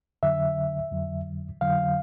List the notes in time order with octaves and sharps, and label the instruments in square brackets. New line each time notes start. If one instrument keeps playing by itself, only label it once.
[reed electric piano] F2 D3 F#3 E5
F2 D3 F#3
F2 D3 F#3 F5